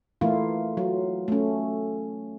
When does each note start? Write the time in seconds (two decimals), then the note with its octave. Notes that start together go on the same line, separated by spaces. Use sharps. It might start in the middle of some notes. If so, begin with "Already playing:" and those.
0.21 E3 A3 A#3 E4 F4
0.77 F#3 F4
1.28 A3 C#4